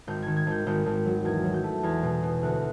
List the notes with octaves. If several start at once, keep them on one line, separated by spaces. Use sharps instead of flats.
G#1 G6
D#3 G#6
G#6
G#1 G6
G#1 G6
G#1
F#3
E2 G#6
F#3
G6
A3
E2 G#6
B2
B2
D2 F#6